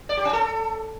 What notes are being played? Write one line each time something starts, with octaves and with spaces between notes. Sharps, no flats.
D5
G4
C#4
A4